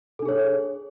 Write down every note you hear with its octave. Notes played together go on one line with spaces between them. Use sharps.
D4 G#4 A4 C#5